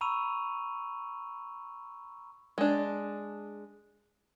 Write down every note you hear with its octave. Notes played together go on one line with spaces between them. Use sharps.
A#5 B5 C#6 E6 D#7 F7
G#3 D4